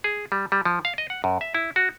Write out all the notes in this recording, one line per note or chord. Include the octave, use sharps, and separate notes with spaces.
G#4
G3
G3
F3
F5
D#5
F#5
F#2
E5
E4
F#4